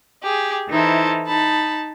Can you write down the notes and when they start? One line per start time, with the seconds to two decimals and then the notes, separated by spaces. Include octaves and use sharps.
0.22 G4 G#4
0.69 E3 D#4 E4 A4 C5
1.26 D#4 A5 B5